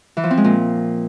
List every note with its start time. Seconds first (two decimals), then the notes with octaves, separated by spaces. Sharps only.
0.17 E3
0.24 F3
0.31 C4
0.37 G#3
0.44 A#2